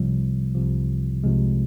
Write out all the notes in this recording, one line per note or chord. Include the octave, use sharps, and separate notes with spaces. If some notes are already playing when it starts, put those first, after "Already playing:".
Already playing: C2 C3 F3 G3
C2 C3 F3
C2 C3 F3 G#3